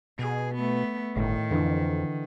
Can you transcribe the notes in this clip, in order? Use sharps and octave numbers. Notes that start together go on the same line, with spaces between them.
B2 G#4
A3 B3
G1 A2 D#3
F2 D3 E3